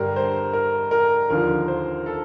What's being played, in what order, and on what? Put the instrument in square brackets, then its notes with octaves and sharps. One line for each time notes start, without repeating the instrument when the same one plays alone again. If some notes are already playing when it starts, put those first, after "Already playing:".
Already playing: [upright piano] G2 D3 G3 A#4
C5
A#4
A#4
D#2 D3 F3 A#4
C5
A4